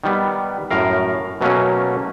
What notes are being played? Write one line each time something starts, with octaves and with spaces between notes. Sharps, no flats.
D#3 G3 B3
F#2 A2 A#4 F5
B2 F#3 A3 A#3 C#4